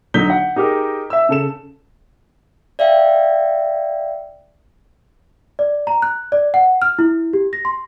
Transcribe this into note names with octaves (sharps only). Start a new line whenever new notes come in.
D3 F#3 D#4 G6 B6 G7
F#5
D#4 G4 G#4 A#4
E5 E6
C#3 A4 E7
D5 E5 F5 G5
D5
A#5
F#6
D5
F#5
F6
E4
G4
A#6
C6